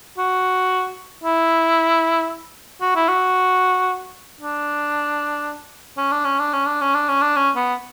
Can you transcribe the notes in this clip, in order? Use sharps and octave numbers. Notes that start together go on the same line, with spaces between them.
F#4
E4
F#4
E4
F#4
D4
C#4
D4
C#4
D4
C#4
D4
C#4
D4
C#4
D4
C#4
B3